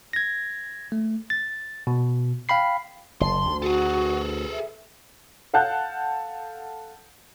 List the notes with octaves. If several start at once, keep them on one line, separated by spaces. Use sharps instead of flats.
G#6 A#6
A3
A6
B2
F5 G5 B5 C7
F#1 A5 C6
D2
F#4 G#4 A4
E5
A4 F5 F#5 A5 F#6 G6